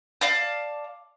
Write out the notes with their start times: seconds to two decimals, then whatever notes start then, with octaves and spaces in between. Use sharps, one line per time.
0.21 D5 F5 A5